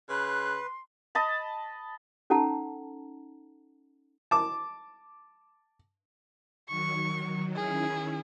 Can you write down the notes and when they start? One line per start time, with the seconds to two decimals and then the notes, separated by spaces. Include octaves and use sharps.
0.09 C#3 B4 C6 F#6
1.15 D#5 A5 B5
2.30 C#4 D#4 A4 F#5 A5 A#5
4.31 A5 D6
6.69 D#3 F#3 C#6
7.55 D#3 C#4 E4 G#4